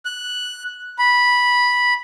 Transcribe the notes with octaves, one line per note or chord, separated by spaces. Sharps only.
F#6
B5